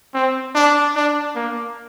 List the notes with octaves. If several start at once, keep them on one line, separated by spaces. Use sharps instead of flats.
C4
D4
D4
A#3